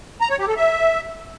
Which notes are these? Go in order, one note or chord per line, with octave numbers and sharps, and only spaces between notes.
A#5
C#5
G4
A4
E5